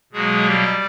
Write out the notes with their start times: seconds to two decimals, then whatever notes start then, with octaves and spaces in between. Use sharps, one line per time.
0.13 B2 F#3 G#3 A#3 G#4
0.45 G3 G4